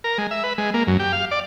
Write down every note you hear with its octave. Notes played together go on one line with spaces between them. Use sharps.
A#4
G#3
E5
B4
G#3
A#3
F#2
G4
F5
D5